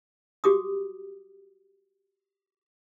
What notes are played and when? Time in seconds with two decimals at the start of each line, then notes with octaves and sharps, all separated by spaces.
0.44 F#4 G4 D6 D#6